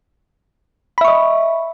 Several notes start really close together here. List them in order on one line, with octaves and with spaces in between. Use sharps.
B5 E5 C#6 D#5